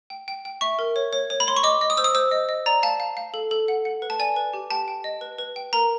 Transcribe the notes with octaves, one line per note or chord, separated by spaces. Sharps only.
G5
G5
G5
E5 C#6
A#4
C#5
C#5
C#5
B5
C#5 C6
C#6
D#5 D6
D#5
D#6
C5 E6
D#6
C5 E6
D#5
D#5
D5 A#5
F5 A5
F5
F5
A4
A4
F#5
F#5
B4
A5
D5 G#5
B4
G4
G5 A5
G5
D#5
B4
B4
G5
A#4 A#5